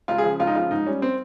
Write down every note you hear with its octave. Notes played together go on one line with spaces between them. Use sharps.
C#2 F4
G#4
C#3 F3
C#2 F4
D#4
C#3 F3 F4
G#2 D#4
G3 C#4
C4